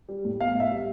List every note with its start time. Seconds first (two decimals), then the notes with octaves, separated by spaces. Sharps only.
0.09 G3
0.25 A2
0.40 B3 F5
0.55 A2
0.60 E5
0.71 G3